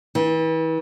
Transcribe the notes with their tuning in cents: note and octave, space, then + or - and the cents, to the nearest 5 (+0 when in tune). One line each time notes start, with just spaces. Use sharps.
E3 -35